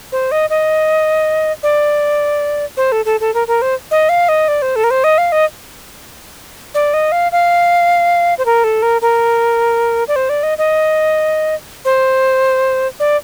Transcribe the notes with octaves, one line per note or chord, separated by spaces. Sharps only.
C5
D#5
D#5
D5
C5
A4
A4
A4
A#4
A#4
C5
D#5
F5
D#5
D5
C5
A4
A#4
C5
D#5
F5
D#5
D5
D#5
F5
F5
C5
A#4
A4
A#4
A#4
D5
C5
D5
D#5
D#5
C5
D5